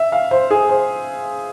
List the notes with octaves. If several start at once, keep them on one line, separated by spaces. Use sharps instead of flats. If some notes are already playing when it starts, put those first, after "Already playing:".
Already playing: E5
F5
C5
G#4
C5